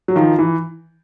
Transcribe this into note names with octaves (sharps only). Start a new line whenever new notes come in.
F#3
D#3 F3
E3